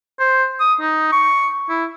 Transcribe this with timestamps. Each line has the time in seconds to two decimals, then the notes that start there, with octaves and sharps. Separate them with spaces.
0.20 C5
0.60 D#6
0.81 D#4
1.12 C#6
1.69 E4